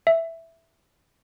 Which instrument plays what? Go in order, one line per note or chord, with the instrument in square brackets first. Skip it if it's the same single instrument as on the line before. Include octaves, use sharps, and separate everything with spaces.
[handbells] E5